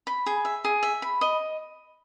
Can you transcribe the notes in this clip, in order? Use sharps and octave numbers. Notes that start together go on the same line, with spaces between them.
B5
G#4
E5
G#4
E5
B5
D#5